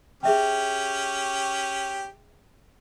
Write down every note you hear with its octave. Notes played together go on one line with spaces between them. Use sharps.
C#4 G4 G#4 E5 G5